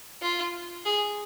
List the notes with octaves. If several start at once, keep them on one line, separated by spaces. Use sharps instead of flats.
F4
G#4